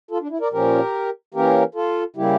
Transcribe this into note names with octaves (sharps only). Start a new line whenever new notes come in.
F4 A4
D4
E4
A#4 D5
A#2 F3 C#4 G4 A#4
E3 A#3 C#4 G4 A#4
F4 A4
C#3 G3 A#3 E4 G4